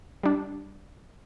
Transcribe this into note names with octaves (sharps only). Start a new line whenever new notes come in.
G3 D4